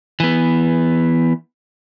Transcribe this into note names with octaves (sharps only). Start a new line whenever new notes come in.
E3 B3